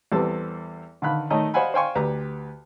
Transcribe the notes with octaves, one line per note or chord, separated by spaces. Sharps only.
E2 G3 B3 C4 A4 A5
D3 D#3 F5 B5 F#6
D#3 A3 C#5 D#5 A#5
C5 D#5 F5 F#5 G#5 B5
C5 F5 G5 G#5 C6 C#6
D2 G4 B4 A#5